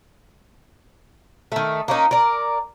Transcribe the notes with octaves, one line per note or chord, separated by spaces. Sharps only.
D#3 A3
A#3 C#4 D#4
A#4 D5